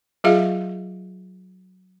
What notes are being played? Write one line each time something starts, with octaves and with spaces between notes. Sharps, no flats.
F#3 F4 G#4 E5 F5